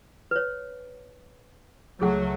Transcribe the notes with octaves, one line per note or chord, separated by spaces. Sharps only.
B4 C#5
C#2 F#3 A3 G#4 F#5